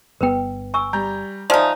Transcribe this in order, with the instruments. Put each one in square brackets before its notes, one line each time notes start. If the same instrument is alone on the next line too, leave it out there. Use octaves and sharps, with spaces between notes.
[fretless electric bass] G1 B3 [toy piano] A#4 B4 G5
[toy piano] G#5 C#6 E6
[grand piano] G3 A#5 G6
[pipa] F3 D#4 [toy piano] D5 G#5 D#6 [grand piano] E5 A5 F6